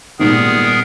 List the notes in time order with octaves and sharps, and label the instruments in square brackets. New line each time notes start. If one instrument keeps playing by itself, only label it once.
[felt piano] G#1 A#2 G3 [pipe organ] B3 G#4 A#4